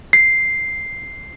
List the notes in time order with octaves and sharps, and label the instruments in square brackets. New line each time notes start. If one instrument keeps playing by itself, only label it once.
[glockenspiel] C7